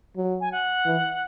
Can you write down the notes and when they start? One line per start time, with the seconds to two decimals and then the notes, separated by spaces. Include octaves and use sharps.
0.16 F#3
0.40 G#5
0.51 F#5
0.85 E3